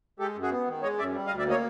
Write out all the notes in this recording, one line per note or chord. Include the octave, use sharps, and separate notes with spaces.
G#3 G4 A4
F#2
F#4 G#4
B3
D#3
G#3 C#5 D#5
F#2 D5 E5
G3
D#5 F5
D2
D5 E5
A#3 C#5 D#5